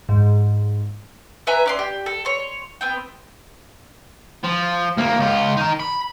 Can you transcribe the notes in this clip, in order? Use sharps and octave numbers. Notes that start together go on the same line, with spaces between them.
G#2
B4 E5 G#5 A#5
C#4 D5 C6
G4
A4
C#5 C6
B3 C4 G5
F3
D2 A#3
C#2 F4
D#4 A#4
B5